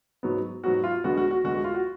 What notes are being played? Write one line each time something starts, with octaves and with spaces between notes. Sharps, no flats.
G#2 F#3 B3
G#2 F#3 B3 F#4
F4
D2 D3 G#3 B3 F#4
F#4
F#4
D2 D3 G#3 B3 F#4
F#4
F4
F#4